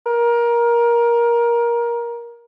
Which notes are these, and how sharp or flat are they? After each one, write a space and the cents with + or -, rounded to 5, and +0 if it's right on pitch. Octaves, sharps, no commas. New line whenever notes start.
A#4 +20